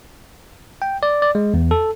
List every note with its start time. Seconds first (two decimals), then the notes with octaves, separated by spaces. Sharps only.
0.82 G5
1.03 D5
1.22 D5
1.35 G#3
1.54 E2
1.71 A4